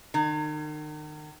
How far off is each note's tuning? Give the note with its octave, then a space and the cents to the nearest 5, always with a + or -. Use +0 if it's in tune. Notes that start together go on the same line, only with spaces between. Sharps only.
D#3 -40